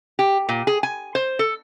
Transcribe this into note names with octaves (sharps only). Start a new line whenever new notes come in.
G4
A#2
G#4
G#5
C5
A4